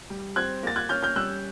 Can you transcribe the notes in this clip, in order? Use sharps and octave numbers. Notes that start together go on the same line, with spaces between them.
G3
C4 F#6 G#6
A#3 A6
F#6 G#6
C#4 F6 G6
F6 G6
G3 E6 F#6